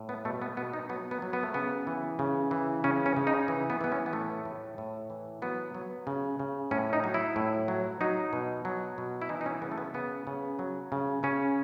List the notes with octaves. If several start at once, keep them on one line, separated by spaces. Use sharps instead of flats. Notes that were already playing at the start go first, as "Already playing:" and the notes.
Already playing: A2
B3
B2 A3
B3
B2 B3
D#4
F#3 B3
B3
F#3
B3
A3
C#3 B3
E3
C#3
E3
C#3 C#4
C#4
C#3
D#4
E3
B3
E3 B3
C#4
B3
A2 A3
A2
A2
E3
F#3 B3
F#3
C#3
C#3
A2 C#4
D#4
F#3
E4
A2
F#3
F#3 D#4
B2
F#3
B2
E4
E3 D#4
D#4
C#4
C#3 B3
A3
B3
C#3 B3
C#3
F#3
C#3
C#3 C#4